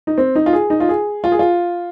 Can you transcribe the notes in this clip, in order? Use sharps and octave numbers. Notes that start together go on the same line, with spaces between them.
D#4
C4
D#4
F4
G#4
D#4
F4
G#4
F4
G#4
F4